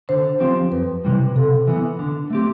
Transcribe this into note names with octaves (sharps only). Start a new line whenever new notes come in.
D3 C5
F3 C4 G4
F2 B4
C3 E3 G3
C3 A4
E3 B3
D3
A3 C4 G4